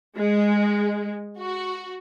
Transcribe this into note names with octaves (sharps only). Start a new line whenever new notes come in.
G#3
F#4